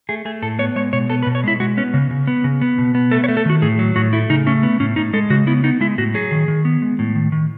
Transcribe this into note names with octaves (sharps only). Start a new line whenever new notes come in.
A3 G#4
A3 G#4
A2 A4
B3 C#5
G#3 C#5
B2 C#5
B3 A4
B4
B2
C#5
G#3 E4
G#3 F#4
B3 C#4
C#3
C#3
B3
C#3
B3
B2
B3
A3 A4
C#5
A3
A4
D#3 F#4
A2 G#4
F#3
A2 F#4
A3 E4
C#3 D#4
A3 C#4
B3
A2 C#4
A2 D#4
G#3 A4
C#3 F#4
B3 E4
B3 D#4
G#3 E4
A2 F#4
F#3 G#4
D#3
D#3
B3
G#3
A2
D#3
D#3